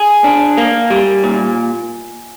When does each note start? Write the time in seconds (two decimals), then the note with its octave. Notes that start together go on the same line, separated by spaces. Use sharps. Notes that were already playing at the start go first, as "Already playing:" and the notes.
Already playing: G#4 G#5
0.24 D4
0.57 A#3
0.90 G3
1.24 A#2